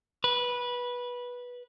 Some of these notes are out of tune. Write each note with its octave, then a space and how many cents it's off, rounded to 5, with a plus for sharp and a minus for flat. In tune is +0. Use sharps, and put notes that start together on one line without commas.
B4 -15